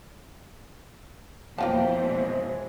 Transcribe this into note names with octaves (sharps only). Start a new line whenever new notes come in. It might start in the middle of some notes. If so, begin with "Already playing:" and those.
F2 B2 E3 A#3 F4 C5 G5 A5
F3 F#3 G#3